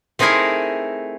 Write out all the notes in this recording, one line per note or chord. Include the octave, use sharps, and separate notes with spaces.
A3 C4 D#4 E4 G#4 A#4